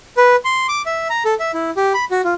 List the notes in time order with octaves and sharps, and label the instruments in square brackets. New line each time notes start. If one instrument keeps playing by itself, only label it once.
[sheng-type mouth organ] B4
C6
D6
E5
A#5
A4
E5
E4
G4
B5
F#4
F4